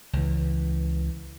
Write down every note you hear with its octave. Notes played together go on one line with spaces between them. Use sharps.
C#2 E3